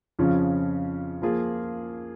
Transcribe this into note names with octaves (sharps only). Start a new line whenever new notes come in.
F2 C#3 F3 C#4 F4
F3 A#3 F4 G#4